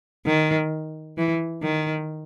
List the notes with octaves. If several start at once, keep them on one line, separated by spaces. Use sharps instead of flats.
D#3
E3
D#3